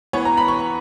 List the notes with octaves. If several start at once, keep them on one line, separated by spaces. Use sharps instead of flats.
E3 B3 C#5
A#5
B5
C#6